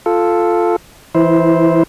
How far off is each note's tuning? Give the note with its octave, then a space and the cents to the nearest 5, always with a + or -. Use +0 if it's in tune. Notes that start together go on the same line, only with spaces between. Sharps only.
F4 +0 A4 +0
E3 +15 E4 -20 C5 +0